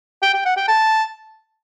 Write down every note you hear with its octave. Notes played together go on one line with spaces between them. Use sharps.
G5
G5
F#5
G5
A5